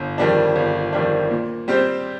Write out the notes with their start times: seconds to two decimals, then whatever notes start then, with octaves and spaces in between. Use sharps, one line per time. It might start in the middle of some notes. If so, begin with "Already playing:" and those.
Already playing: G1
0.18 F2 D#3 G3 D4
0.56 G1
0.93 F2 D#3 G3 D4
1.31 A#2
1.68 G3 C4 G4 C5